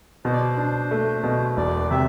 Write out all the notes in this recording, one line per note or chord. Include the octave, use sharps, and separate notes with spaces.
B2 C5
D5
C5
D4
A3
B2
E1 D5
C3 E5